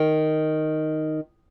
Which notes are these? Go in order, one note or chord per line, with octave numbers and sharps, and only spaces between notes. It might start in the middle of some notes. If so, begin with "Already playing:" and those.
Already playing: D#3